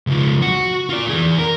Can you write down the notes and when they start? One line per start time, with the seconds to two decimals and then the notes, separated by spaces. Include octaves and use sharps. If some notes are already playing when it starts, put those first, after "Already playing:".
0.07 C#2 F3
0.42 F#4
0.89 F4 D5
1.09 E3 G#4
1.39 A#4